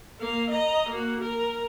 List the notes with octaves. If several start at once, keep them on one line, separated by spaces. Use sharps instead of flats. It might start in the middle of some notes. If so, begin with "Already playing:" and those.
A#3 F5
D#5 A#5
A#3 F#4
A#4